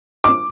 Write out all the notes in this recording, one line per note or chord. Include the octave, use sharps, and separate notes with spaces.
D6